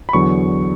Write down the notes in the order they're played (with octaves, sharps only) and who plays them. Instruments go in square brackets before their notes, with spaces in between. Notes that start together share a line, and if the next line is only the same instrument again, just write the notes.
[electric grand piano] B5
E2 D3 F#3 C#6